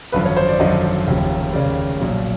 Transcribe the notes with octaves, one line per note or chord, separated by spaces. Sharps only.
G#1 F#2 D3 F3 B4
C#5
C5
D5
G#1 F#2 D3 F3 D#5
F1 D#2 C#3 F3
F1 D#2 C#3 F3 D5
B1 A#2 F3